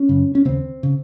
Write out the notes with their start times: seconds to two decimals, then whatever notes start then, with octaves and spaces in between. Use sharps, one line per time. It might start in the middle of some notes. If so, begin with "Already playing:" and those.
Already playing: C#4
0.09 F#2 C#3
0.35 C#4
0.45 D#2 C#3 C4
0.83 C#3